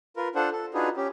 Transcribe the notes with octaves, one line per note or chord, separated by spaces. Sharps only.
F4 A#4 B4
D4 F4 A4 C5 F#5
A4
D4 D#4 F4 F#4 G#4 B4
C#4 G4